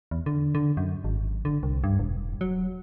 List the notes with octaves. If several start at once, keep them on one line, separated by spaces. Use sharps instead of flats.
E2
D3
D3
F#2
G#1
D3
C2
G2
E1
F#3